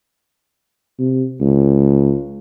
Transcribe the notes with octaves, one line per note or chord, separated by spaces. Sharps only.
C3
C#2